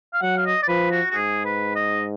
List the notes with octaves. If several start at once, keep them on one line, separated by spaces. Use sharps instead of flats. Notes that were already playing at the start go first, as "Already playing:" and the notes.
F5
F#3 F#5
F5
D#5
D5
F3 B4
F#4
F#4
G#2 G#4
B4
D#5